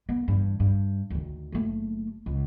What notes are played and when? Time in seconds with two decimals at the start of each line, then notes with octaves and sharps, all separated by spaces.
0.09 B3
0.28 G2 E3
0.60 G2
1.10 D2 D#3
1.52 F#1 A3
2.26 C#2